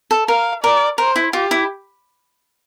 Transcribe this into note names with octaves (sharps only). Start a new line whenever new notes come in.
A4
A#4 F5
A#4 D5
A#4 C5
E4
F4 G4
E4